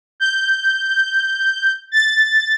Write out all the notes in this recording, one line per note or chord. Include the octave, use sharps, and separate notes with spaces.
G6
A6